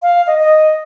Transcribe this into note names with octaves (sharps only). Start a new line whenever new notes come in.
F5
D#5
D#5